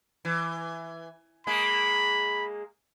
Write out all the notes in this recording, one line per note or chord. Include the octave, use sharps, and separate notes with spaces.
E3
G#3 A#3 G#4 B5